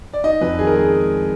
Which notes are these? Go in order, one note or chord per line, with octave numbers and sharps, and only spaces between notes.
D5
D#4 D#5
F2 B4
D#3 G#4
A#4
G#3 G#4